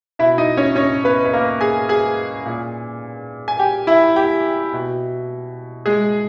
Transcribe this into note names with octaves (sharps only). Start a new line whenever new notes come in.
B2 E4 E5
D#4 D#5
C#4 C#5
C#4 C#5
B3 B4
B4
A#3 A#4
G#4 G#5
G#4 G#5
A#2
G#5
G4 G5
E4 E5
G4 G5
B2
G#3 G#4